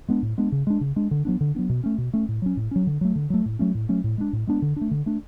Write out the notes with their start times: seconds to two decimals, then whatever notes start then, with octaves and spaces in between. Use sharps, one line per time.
0.08 G#3 B3 D4
0.22 A2
0.38 G#3 B3 D4
0.52 C#3
0.67 G#3 D4
0.81 C#3
0.96 G#3 D4
1.11 D3
1.25 F#3 B3 D4
1.41 D3
1.55 F#3 B3 D4
1.69 B2
1.83 A3 C#4
1.98 B2
2.13 A3 C#4
2.28 A2
2.42 F#3 C#4
2.57 A2
2.71 F#3 C#4
2.87 D3
3.01 F#3 A3
3.16 D3
3.30 F#3 A3
3.46 A2
3.59 F#3 A3 C#4
3.75 A2
3.89 F#3 A3 C#4
4.04 A2
4.18 G#3 B3 D4
4.33 A2
4.47 G#3 B3 D4
4.62 D3
4.76 A3 D4
4.91 D3
5.06 A3 D4